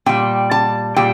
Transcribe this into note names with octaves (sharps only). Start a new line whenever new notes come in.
A#2 G3 G5
A5
A#2 G3 G5